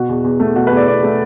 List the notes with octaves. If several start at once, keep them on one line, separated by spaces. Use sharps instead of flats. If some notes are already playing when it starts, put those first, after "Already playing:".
Already playing: B2 F#4
E2
E2
A3
B2 F#4
E2 B4
D5
E2 D5
A3